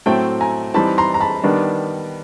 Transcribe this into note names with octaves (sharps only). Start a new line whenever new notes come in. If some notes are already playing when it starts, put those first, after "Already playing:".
A2 F#3 A3 C4 G5 A5
G#5 A#5
E3 G3 C4 D#4 A5 B5
A#5 C6
A#5
A5 B5
D#3 G3 B3 D4